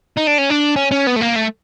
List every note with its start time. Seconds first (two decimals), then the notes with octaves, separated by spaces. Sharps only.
0.17 D#4
0.27 D4
0.38 C#4
0.50 D4
0.76 C#4
0.91 C#4
1.07 B3
1.16 A3
1.21 A#3
1.36 A3